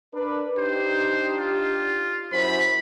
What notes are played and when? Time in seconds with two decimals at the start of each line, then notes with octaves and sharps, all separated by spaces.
0.14 D4 A#4 B4
0.58 D4 D#4 G4 C5
1.39 F4
2.32 F#2 E4 C5 B5